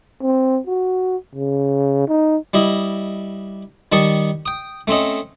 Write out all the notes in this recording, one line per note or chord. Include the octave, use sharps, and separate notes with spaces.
C4
F#4
C#3
D#4
G3 E4 D#5
D#3 G3 A5 C#6 D#6
G5 D#6
A3 C4 C#4 D#5